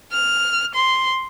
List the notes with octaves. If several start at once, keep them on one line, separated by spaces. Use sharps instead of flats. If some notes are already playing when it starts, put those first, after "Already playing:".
F6
C6